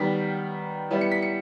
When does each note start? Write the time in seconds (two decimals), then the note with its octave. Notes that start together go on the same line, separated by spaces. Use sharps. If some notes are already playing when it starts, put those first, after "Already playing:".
Already playing: D#3 G3 B3 B6
0.91 G3 B3 E4
1.01 C#7
1.11 B6
1.22 C#7